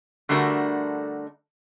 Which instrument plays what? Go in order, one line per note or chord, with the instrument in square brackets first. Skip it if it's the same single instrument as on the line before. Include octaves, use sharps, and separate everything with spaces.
[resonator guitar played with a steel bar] D3 G3 A3 D4 F#4 A#4